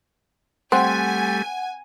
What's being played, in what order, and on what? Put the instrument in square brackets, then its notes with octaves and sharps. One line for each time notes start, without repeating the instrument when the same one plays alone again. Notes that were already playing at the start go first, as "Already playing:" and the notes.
[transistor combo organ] G3 A3 [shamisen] C4 [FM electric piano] F#5 [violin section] G#5